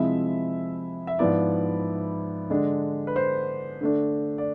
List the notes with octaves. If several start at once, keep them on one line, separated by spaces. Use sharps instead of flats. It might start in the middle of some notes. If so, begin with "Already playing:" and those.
Already playing: C3 F3 G#3 C4 E4 E5
E5
G#2 F3 B3 E4 D5
D3 G#3 D4
B4
C5
D3 A3 D4
D5